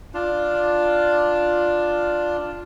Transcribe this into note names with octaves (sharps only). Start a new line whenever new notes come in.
D4 F4